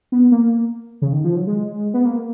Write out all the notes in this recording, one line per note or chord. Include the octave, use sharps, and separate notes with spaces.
B3
A#3
C#3
D#3
F3
F#3
G#3
B3
A#3